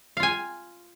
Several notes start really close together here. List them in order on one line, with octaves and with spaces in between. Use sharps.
F5 F4 G#5